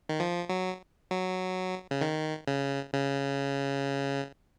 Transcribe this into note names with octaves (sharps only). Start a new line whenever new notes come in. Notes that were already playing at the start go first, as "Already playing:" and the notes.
D#3
F3
F#3
F#3
C#3
D#3
C#3
C#3